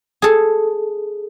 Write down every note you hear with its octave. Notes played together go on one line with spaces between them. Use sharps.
G#4 A4